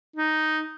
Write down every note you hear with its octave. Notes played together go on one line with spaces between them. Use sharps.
D#4